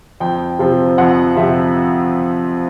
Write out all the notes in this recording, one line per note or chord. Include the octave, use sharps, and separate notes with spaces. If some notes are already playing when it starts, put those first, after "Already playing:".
F2 G5
C3 F3
F2 F#5
C3 F3 E5